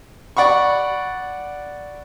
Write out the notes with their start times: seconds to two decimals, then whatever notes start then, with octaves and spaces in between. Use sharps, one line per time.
0.37 D5 F#5 B5 C#6